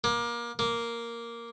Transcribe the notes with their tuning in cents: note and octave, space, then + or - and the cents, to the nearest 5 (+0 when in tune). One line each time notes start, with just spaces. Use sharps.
A#3 +25
A#3 +0